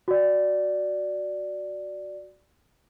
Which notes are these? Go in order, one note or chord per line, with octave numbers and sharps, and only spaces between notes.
F#4 D5